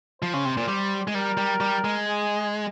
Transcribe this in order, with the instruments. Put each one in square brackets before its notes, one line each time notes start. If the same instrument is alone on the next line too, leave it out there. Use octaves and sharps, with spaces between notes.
[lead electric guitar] F3 [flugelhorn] C5
[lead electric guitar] C#3
C3
A#2
G3
G#3
[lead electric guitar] G3 [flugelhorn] A#4
[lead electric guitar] G3
G3
G#3
[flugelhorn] G#4